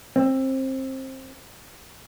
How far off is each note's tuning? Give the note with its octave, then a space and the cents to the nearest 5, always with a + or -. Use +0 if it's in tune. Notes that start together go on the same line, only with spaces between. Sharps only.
C4 +20